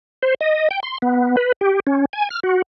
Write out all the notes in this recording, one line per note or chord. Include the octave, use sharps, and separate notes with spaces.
C5
D#5
G5
C6
B3
B4
G4
C#4
G#5
F6
F#4